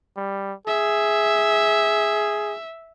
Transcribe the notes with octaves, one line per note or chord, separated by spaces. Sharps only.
G3
G#4 E5